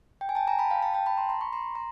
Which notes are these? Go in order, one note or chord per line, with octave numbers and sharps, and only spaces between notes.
G5
G#5
G5 A5
G#5 A#5
A5 B5
F5 G5
G5 A5
G5 A5
A5 B5
A#5 C6
A#5 C6
B5 C#6
A#5 C6
A#5 C6